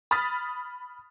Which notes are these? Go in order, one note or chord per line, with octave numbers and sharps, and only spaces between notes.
B5 D#6 F6 A6 B6